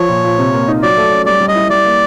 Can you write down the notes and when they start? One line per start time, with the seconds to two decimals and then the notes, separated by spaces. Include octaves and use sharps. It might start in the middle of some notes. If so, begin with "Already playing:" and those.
Already playing: F3 C#5
0.09 A#2
0.24 A#2
0.38 C3
0.53 A#3
0.68 D#4
0.83 F#3 D5
0.97 A3
1.11 C#4
1.26 G3 D5
1.41 G3
1.48 D#5
1.56 E4
1.70 G3 D5
1.85 A#3